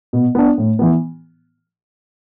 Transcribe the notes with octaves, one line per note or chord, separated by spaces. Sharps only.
B2
B3 D4
A2
E3 B3